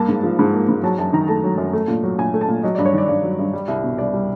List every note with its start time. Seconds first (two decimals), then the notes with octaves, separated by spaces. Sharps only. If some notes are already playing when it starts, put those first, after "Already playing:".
Already playing: G2 A#3 A5
0.09 G#2
0.23 F3
0.39 G#2
0.54 A#3
0.69 G#2
0.83 F#3 A5
0.98 F#2 A5
1.13 D#3 A#5
1.28 A3 A5
1.44 F#3
1.58 F#2
1.73 A3
1.88 A#2
2.03 F#3
2.18 A#2 G#5
2.34 A3
2.41 A5
2.48 A#2
2.63 F#3 D#5
2.75 G2 D5
2.85 C#5
2.93 D#3 D5
3.08 G2 D5
3.24 F#3
3.39 G2
3.53 G3
3.68 C2
3.83 B2
3.98 C2 D5
4.14 G3